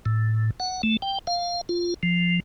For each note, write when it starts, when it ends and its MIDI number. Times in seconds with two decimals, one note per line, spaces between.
0.06 0.51 45
0.60 0.82 78
0.83 0.97 57
1.02 1.19 79
1.27 1.61 77
1.69 1.94 65
2.03 2.40 53